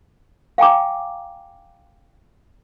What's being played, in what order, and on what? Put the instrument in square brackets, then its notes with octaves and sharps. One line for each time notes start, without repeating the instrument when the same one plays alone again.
[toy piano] F5 G5 G#5 A#5 D6